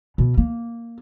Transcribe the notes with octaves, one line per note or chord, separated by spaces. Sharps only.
B2
A#3